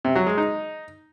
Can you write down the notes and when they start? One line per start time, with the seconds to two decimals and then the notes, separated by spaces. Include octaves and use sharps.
0.05 C3
0.16 F#3
0.27 G#3
0.38 D#4